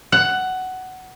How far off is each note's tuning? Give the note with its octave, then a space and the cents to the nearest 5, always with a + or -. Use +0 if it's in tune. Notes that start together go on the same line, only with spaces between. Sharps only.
F#5 +10